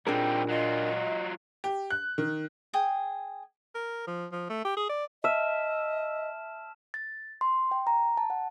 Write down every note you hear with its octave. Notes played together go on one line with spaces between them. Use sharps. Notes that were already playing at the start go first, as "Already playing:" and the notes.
A#2 G3 C4 D4 D#4 G#4 A#4 G5
F#3 F4 D#5
G4
F#6
D#3
G#4 G5 D#6
A#4
F3
F3
A3
G4
G#4
D5
D#5 E5 A5 F6 E7
A6
C6
G5
A#5
A5
F#5